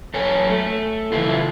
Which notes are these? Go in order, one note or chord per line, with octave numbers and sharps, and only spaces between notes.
F#3 A4 C#5 G#5
A3
C#3 E3 F3 E4 F4